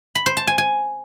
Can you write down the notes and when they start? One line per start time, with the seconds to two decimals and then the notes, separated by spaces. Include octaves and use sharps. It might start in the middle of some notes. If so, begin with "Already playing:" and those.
0.15 B5
0.26 C5
0.37 A5
0.47 G#5
0.58 G#5